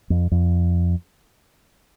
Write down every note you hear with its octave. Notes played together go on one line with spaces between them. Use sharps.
F2
F2